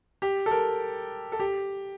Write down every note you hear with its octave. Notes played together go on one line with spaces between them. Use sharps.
G4
A4
A#4
A4
G4